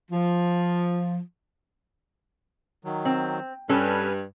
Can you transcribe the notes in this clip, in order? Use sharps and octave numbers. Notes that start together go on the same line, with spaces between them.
F3
D#3 F#3
C4
G2 C#4 A4 B4 G#5 F6